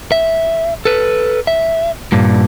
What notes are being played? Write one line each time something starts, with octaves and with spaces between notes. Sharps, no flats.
E5
A4 B4
E5
G2 A#2